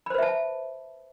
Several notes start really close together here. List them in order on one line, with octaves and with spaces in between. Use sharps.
B5 C5 B4 E5 A5